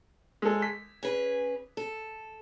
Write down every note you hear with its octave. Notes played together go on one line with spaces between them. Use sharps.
G#3 A4
B6
C#4 G#4 B4
A4